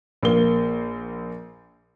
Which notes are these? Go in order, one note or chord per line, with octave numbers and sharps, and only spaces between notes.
A#1 A#3 G7